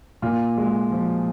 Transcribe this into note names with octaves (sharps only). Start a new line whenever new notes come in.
A#2 F4
G#3
F3